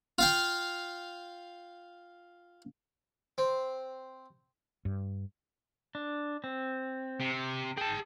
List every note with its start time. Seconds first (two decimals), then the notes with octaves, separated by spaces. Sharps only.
0.19 F4 F5 G5
3.38 C4
4.85 G2
5.95 D4
6.44 C4
7.20 C3
7.78 G#4 G5 A5